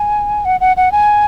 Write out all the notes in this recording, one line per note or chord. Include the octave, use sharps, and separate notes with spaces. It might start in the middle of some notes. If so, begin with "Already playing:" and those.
Already playing: G#5
F#5
F#5
F#5
G#5